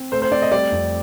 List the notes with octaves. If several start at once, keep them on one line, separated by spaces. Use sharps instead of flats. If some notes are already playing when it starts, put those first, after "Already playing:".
Already playing: C4
A3 C5
C5
C4 D5
D#5
G3 D5
F2